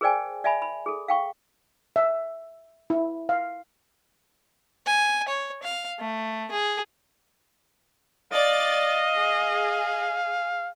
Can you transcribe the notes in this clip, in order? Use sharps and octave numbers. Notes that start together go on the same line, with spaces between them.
G#4 A#4 C5 D5 G5 G#5
D5 E5 G#5 B5
B5
G#4 A4
F5 G5 C#6
E5
E4
F5
G#5
C#5
F5
A3
G#4
D5 D#5 F5 A6
G#4